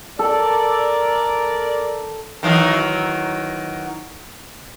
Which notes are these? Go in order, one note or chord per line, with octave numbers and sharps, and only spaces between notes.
A4 A#4 D5
D#3 E3 F#3